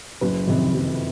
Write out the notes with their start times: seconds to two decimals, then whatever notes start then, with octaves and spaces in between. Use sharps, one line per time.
0.21 F#1 B4
0.47 F2 C3 D#3
0.74 F#1